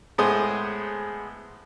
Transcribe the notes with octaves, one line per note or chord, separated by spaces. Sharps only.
A2 G#3 B3 G#4 C5 D#6